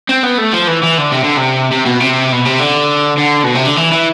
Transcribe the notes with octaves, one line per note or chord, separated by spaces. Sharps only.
C4
B3
A3
F3
E3
E3
D3
C3
D3
C3
C3
B2
C3
B2
C3
D3
D3
B2
C3
D3
E3
E3